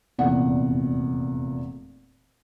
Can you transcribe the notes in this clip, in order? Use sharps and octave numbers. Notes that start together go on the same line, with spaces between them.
F1 E2 A#2 F#5